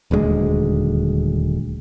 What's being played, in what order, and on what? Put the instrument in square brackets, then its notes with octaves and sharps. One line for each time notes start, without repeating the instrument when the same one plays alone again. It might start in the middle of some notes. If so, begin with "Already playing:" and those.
[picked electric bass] D#1 D2 G3 G#3